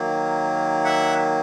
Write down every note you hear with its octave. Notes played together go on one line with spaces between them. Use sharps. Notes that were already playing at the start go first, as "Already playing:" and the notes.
Already playing: D#3 F#3 A#3
E5 F#5